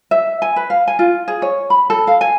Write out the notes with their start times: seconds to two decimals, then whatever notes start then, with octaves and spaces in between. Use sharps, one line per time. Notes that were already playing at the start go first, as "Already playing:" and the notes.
0.11 E5
0.42 G#5
0.56 B4
0.70 F5
0.88 G#5
0.99 F4
1.28 G#4
1.42 C#5
1.70 B5
1.90 A4
2.07 F5
2.21 G#5